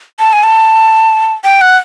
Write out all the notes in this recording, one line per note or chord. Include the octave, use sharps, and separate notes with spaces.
A5
G#5
A5
G5
F#5